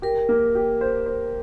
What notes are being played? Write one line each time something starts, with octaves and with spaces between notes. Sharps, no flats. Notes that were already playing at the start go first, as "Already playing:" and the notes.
G4 A#4
A#3
G4
C5
C5